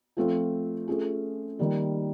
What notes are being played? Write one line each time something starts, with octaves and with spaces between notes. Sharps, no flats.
F3 A3 C4 F4
A3 C#4 F4 G#4
D#3 G3 A#3